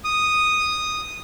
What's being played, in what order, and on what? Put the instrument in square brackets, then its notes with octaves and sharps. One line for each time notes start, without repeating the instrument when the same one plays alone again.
[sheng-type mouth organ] D#6